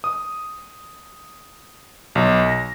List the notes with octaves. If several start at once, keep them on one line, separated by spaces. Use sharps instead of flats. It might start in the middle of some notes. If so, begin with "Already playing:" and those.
D#6
B1
A#6